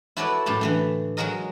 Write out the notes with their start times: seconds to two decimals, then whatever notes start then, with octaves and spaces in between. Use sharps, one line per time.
0.17 E4 F#4 A4 B4 C#5 D5
0.46 F#2 A2 G4 A5
0.61 D3 E3 A3
1.17 F#3 G#3 F#4 G#4 A#4 D#5